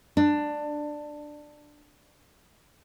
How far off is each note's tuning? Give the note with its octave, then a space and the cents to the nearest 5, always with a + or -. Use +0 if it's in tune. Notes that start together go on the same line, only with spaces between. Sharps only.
D4 +15